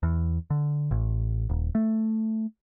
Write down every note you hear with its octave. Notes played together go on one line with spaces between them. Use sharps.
E2
D3
A1
D#1
A3